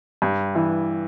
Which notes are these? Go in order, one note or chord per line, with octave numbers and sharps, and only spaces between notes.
G2
E3